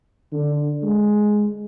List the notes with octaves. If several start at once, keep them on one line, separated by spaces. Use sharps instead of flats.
D3
G#3